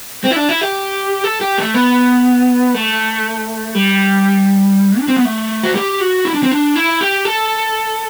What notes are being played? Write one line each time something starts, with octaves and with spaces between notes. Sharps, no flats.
C4
E4
D4
E4
G4
A4
G4
A3
B3
A3
G3
D4
C4
B3
A3
F#4
G4
F#4
E4
D4
C4
D4
E4
G4
A4